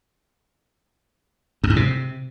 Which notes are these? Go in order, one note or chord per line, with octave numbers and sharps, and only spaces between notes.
F#2
G#2
C3